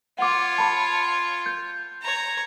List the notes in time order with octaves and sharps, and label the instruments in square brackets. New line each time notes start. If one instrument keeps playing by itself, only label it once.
[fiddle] F4 C#5 [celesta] F#5 D6
[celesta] A5 B5
G6
[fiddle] C#5 A#5